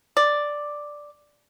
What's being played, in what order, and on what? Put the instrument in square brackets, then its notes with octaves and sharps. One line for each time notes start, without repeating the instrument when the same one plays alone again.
[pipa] D5